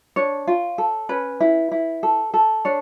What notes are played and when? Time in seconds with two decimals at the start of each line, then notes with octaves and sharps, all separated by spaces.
0.16 D4 C#5
0.47 F4
0.78 A4
1.09 C#4 B4
1.40 E4
1.72 E4
2.03 A4
2.34 A4
2.65 D4 C#5